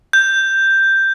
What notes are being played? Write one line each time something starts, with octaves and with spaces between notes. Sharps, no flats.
G6